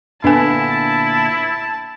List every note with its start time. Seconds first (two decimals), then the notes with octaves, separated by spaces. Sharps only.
0.24 A#2 D3 B3 D4 E4 G#5 A5